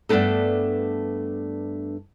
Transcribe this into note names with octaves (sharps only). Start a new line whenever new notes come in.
G2 A3 B3 D4 D#4 A4